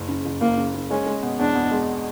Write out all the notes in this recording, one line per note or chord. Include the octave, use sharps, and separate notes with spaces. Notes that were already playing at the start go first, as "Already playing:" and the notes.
Already playing: F#1
C#3
F#1
F#1 A#3
C#3
C#3
G#3 C#4
G#3
B2
E2 D4
B2
G#3